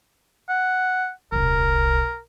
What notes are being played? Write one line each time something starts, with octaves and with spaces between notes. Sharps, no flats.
F#5
D#1 C2 A#4